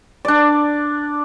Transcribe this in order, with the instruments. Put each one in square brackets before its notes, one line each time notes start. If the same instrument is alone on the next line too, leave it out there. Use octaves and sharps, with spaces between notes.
[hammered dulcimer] D4 D5